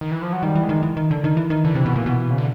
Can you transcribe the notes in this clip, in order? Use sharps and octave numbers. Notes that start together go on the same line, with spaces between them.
D#3
E3
F3
F#3
D#3 G3
E3
G#3
D#3
E3
D#3
D3
D#3
E3
D#3
D3 E3
C3
B2
A#2
B2
C#3
D3